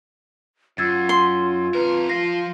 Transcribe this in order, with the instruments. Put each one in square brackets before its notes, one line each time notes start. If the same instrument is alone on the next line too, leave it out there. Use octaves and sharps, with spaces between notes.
[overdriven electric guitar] F#2 [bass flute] F4 [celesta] E6 G#6 A6
[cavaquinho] C6
[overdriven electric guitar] F2 A#4 [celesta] B4
[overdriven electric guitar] F3 F5 [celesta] A#6